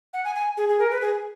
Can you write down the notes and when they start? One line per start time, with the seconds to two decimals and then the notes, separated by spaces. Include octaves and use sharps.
0.13 F#5
0.24 G#5
0.35 G#5
0.57 G#4
0.69 G#4
0.79 A#4
0.91 B4
1.01 G#4